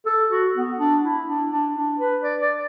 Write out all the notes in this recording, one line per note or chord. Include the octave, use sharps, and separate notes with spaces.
A4
F#4
B3
D4
E4
D4
D4
D4
B4
D5
D5